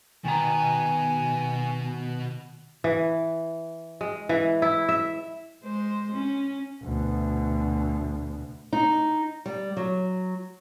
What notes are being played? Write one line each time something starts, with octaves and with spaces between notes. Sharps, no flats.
B2 D#3 B3 G#5 A#5
E3
G#3
E3
E4
E5
G#3 C5
C#4
D2 B2
D#4
G3
F#3